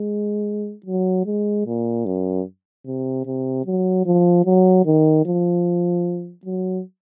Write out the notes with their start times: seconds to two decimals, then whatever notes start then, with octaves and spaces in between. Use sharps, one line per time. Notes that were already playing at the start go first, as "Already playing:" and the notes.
Already playing: G#3
0.86 F#3
1.26 G#3
1.66 A#2
2.06 F#2
2.86 C3
3.26 C3
3.66 F#3
4.06 F3
4.45 F#3
4.86 D#3
5.26 F3
6.45 F#3